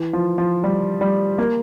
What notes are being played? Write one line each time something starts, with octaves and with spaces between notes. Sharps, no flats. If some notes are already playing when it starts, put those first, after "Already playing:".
Already playing: E3
F3
F3
G3
G3
A#3